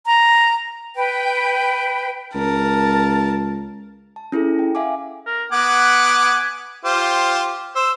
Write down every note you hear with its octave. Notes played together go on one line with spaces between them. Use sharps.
A#5
B4 G5
C#2 A#4 A5
A5
C#4 E4 G#4 A4
G5
E5 F5 G#5 D6
A#4
B3 F#5 G#5 D6
F4 G4 C5
C5 E6